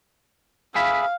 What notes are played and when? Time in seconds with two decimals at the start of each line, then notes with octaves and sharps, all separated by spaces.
0.75 G#4 E5 F5 B5